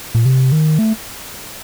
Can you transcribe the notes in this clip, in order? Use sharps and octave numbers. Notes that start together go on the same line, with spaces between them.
A#2
C3
D#3
A3